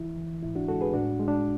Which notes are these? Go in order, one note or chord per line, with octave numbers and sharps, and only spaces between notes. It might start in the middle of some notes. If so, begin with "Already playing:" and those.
Already playing: E3 E4
E3
G#2 E4
D4 F#4
G#3 F#4 A4
G#4 B4
A2 D4 F#4
G#3
D4